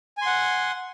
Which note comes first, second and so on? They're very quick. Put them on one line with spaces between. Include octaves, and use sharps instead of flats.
G#5 C6 F#5